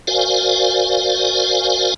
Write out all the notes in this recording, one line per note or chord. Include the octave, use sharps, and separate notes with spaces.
F#4 A#4 C5 D5 F5 G#5